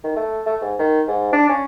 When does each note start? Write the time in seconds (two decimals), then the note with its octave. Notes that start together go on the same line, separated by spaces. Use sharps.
0.04 D#3
0.16 A3
0.46 A3
0.61 G#2
0.79 D#3
1.08 G#2
1.33 D4
1.49 C#4